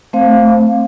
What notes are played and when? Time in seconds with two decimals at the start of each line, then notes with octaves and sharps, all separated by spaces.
0.13 A3 C4 C5 F5